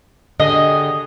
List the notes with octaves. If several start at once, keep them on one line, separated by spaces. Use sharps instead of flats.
D3 G4 G#4 D#5